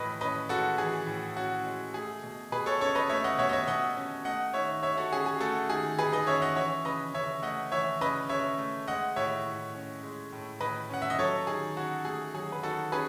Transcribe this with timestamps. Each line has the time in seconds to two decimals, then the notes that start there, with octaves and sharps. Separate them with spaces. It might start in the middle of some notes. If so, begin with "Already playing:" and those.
Already playing: A2 E3 B4 D#5
0.21 C#4 B4 D#5
0.49 G#3 F#4 A4
0.78 E3 G#4
1.07 A2
1.36 C#4 F#4
1.65 G#3
1.94 A3 G#4
2.23 B2
2.52 B2 G#4 B4
2.66 A4 C#5
2.81 C#4 A4 C#5
2.95 B4 D#5
3.09 A3 C#5 E5
3.24 D#5 F#5
3.38 B2 C#5 E5
3.49 D#5
3.53 C#5 E5
3.67 B2 D#5 F#5
3.96 C#4
4.25 A3 D#5 F#5
4.54 D#3 C#5 E5
4.83 D#3 C#5 E5
4.97 F#4 A4
5.12 C#4 G#4
5.26 G#4
5.40 A3 F#4 A4
5.69 D#3 G#4
5.99 D#3 G#4 B4
6.13 B4 D#5
6.27 C#4 C#5 E5
6.42 D#5 F#5
6.56 E3 C#5 E5
6.85 C#3 B4 D#5
7.14 C#3 C#5 E5
7.43 A3 D#5 F#5
7.72 E3 C#5 E5
8.01 C#3 B4 D#5
8.29 C#3 C#5 E5
8.58 A3
8.87 G#3 D#5 F#5
9.16 A2 C#5 E5
9.45 A2
9.74 C#4
10.03 G#3
10.32 A2
10.61 A2 B4 D#5
10.89 C#4 F#5
11.02 E5
11.10 D#5
11.19 F#3 A4 C#5
11.47 D#3 G#4
11.77 C#4 F#4
12.05 A3 G#4
12.34 F#3 G#4
12.52 B4
12.63 D#3 F#4 A4
12.92 C#4 G#4 B4